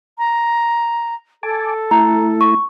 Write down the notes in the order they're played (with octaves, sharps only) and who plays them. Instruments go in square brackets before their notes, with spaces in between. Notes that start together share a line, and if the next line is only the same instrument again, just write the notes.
[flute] A#5
[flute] A4 [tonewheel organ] G#5 A5 D6
[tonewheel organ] A3 E4 [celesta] A#5
[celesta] C#6